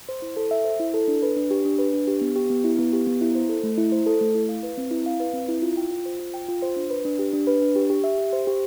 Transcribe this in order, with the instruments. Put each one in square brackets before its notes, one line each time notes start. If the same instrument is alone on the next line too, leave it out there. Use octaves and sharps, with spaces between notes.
[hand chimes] C5
E4
A4
E5
C5
E4
A4
D4
B4
D4
G4
D4
B4
D4
G4
B3
G4
B3
E4
B3
G4
B3
E4
C5
A4
A3
E4
C5
A4
A3
E4
F5
B4
C4
E4
F5
B4
C4
E4
F4
G5
F4
C5
F4
G5
F4
C5
D4
B4
D4
G4
D4
B4
D4
G4
G4
E5
G4
C5
G4